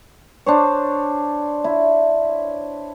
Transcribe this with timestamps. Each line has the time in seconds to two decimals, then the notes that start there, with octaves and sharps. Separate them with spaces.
0.46 D4 C5 C#5
1.64 E4